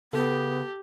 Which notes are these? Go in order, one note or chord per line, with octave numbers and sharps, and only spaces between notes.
C#3 B3 G4 A4